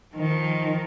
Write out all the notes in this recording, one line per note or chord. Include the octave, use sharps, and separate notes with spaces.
D#3 F3